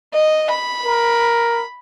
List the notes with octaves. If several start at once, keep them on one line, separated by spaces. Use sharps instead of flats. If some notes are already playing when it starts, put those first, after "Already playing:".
D#5
B5
A#4